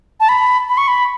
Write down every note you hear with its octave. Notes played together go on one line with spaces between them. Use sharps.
A5
B5
B5
C#6
B5